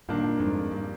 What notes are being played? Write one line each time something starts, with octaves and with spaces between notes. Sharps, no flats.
G2 A#2 D#3 A#3 D4
F2 G#2
G2